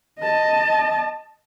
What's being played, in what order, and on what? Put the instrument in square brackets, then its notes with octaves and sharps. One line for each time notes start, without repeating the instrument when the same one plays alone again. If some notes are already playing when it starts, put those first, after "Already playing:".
[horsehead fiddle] D#5 A5